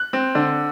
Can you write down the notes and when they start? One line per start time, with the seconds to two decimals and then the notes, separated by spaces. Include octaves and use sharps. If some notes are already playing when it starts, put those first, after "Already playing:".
Already playing: F#6
0.13 C4
0.35 D3